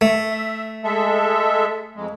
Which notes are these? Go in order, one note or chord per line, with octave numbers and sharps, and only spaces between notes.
A3
E5
G#3 A4 E5
F2 G#3